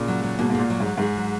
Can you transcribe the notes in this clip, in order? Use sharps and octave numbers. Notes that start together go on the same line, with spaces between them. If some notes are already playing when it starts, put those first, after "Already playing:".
Already playing: A#2 C#3
F#3
F#3
G#2 B2 A#3
G#2
A#2 A#3
F#3
G#2
F#3
G#2 G#4
F#3